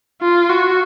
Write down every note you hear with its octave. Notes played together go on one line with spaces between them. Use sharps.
F4
F#4